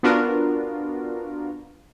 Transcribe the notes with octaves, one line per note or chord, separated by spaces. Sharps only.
B3 D4 F4 F#4 A#4